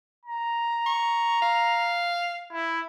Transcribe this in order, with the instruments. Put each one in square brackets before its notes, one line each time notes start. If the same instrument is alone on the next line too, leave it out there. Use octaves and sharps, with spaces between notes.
[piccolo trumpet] A#5
[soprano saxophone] C#6
F5
[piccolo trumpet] E4